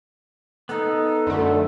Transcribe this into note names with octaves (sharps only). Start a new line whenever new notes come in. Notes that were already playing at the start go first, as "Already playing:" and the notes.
B3 D#4 A4
F#2 D3 A3